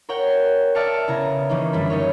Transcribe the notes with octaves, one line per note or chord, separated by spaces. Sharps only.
A#4 C#5 F#5 G5
D5 E5 A5 F6 C#7
C#3 B3 E4 A#5
D#3 E3 A#3 C#4 D#4
F#2 D3 G3 B5
D#4 C#5